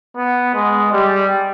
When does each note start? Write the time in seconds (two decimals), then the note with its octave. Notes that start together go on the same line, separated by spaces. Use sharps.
0.17 B3
0.55 G#3
0.93 G3